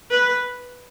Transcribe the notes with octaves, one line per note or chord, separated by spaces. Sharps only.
B4